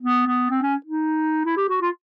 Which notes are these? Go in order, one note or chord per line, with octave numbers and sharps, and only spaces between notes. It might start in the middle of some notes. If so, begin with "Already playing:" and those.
B3
B3
C4
C#4
D#4
E4
G4
F#4
F4